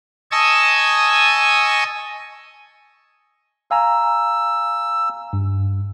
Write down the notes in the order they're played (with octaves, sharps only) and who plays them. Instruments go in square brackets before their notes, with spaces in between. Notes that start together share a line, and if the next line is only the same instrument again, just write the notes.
[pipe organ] D#5 G#5 A5 C#6 D#6 E6
[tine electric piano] F5 G#5 A#5 [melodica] E6
[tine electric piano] G2